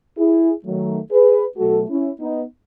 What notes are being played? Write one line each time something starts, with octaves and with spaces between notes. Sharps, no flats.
E4 G#4
D#3 F#3 A3
G#4 B4
B2 F#3 A3 F#4 A4
C#4 E4
B3 D#4